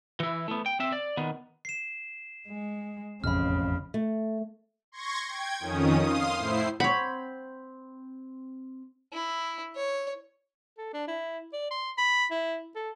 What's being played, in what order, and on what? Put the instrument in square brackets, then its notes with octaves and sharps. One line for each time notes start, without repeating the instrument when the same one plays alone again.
[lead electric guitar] E3 E4
A3 B3
G5
C4 E5
D5
D#3 B3
[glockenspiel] C7 E7
[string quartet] G#3
[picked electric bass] E1 A1 F2 [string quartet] C#3 [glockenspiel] B5 F6
[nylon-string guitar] A3
[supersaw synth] C6 C#6 G#6 A#6
G5 G#6
F2 D#3 C#4 D#6
F5 C6 D#6
A2 E4 C5 C7
[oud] C4 C#5 [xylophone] F#5 [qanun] B5
[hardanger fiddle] E4
C#5
[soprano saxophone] A4
D4
E4
D5
C6
B5
E4
A4